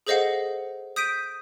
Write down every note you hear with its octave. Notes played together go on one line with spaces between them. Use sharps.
G#4 A4 C5 D#5 F5 F#5
D#6 G6 B6 D7 D#7